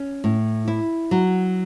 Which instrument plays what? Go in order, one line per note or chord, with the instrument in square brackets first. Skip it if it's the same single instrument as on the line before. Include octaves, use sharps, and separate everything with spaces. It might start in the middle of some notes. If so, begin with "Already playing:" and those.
Already playing: [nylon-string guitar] C#4
A2
E4
F#3